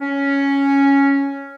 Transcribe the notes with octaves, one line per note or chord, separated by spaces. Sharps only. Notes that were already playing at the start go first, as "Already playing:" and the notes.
C#4